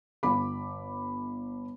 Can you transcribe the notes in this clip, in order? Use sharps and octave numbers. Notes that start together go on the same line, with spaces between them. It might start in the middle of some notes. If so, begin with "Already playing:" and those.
G1 B5 D6